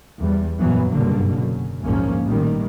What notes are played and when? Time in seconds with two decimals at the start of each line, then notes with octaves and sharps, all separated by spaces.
0.19 E2 G3
0.59 F#2 A#2 E3 F#3 B3
0.91 F#1 G2 B2 D3 A#3
1.35 F#2
1.82 A#1 D#2 G#2 F3 A#3 C#4
2.25 A1 A#2 D#3 G3